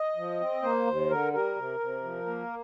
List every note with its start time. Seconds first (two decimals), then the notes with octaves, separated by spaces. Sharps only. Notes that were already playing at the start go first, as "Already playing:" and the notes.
Already playing: D#5
0.16 F3
0.40 C4
0.63 A#3 C5
0.87 D#2
1.10 D3 A#4
1.33 G3 A#4
1.56 C3
1.80 C3
2.03 F3
2.26 A#3